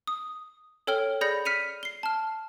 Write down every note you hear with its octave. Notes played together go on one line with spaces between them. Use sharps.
D#6
A4 C#5 G5 F6 G7
G#4 D5 B5 G6 A#6 C#7
F6 B6 C#7 D#7 F7
C7 G7
A5 F6